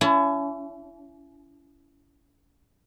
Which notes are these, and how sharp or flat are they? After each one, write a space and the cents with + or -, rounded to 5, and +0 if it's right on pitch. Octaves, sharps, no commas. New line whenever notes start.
C#4 +35 E4 +30 A5 +0